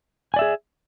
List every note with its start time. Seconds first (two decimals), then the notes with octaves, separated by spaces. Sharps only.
0.34 G#5
0.36 D5
0.39 E5
0.41 G#4